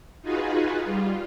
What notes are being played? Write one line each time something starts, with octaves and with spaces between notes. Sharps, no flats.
D#4 F4 F#4 G#4 B4
G3 F4